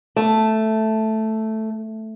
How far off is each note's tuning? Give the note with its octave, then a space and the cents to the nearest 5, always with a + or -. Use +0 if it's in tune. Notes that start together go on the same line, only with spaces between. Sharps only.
A3 +0